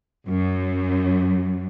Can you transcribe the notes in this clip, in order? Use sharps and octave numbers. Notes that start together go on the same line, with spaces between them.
F#2